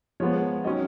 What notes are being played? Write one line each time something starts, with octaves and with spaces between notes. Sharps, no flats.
F3 G#3 B3 C#5
D#3 F#3 C#4 D#5